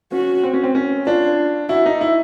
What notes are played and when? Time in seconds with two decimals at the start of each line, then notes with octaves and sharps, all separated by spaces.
0.12 C#4 F#4
0.43 C4
0.54 C#4
0.63 C4
0.75 C#4
1.07 D4 F4
1.69 E4 F#4
1.86 D#4
2.01 E4